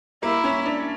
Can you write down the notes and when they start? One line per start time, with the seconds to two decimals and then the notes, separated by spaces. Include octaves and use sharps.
0.23 A#3 E4
0.44 C#4
0.66 D4